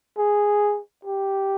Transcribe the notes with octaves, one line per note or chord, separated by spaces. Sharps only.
G#4
G4